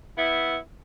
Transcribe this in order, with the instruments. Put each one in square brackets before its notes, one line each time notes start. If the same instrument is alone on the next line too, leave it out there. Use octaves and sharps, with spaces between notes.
[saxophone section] B3 E4